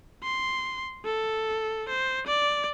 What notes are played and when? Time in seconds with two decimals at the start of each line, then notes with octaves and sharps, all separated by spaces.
0.23 C6
1.05 A4
1.89 C5
2.27 D5